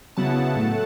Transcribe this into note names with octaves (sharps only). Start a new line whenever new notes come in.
C#3 F#3 B3 E4 F#5 A5
A2 F#3 A3